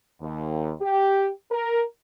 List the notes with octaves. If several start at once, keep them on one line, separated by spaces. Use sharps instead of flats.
D#2
G4
A#4